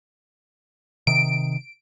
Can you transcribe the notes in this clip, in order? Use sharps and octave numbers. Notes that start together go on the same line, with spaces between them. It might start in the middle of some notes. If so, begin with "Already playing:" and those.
C3 D#3 D7